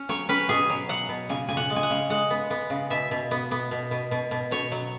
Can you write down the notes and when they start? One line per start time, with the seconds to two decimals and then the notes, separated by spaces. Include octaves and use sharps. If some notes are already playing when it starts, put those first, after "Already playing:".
Already playing: C#4
0.09 F#3 C#5
0.29 C#4 B4
0.49 B2 G#4
0.69 F#3
0.89 F#3 F#5
1.09 B2
1.29 C#3 G#5
1.49 C#3 G#5
1.57 F#5
1.70 G#3
1.76 G#5
1.83 F#5
1.90 C#3
2.10 G#3 F#5
2.30 B3
2.50 B3
2.70 C#3
2.90 B2 E5
3.11 B2
3.31 B3
3.51 B3
3.71 B2
3.91 B2
4.11 B2
4.31 B2
4.51 B2 C#5
4.72 F#3